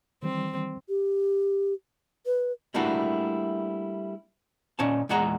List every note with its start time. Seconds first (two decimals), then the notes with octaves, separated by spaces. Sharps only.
0.23 D#3 E3 G3 C4
0.89 G4
2.26 B4
2.74 G3 A3 A#3 D4 E4 F#4
4.79 A#2 C#4 D#4 A5
5.09 E2 A#2 G#3 F#5 A#5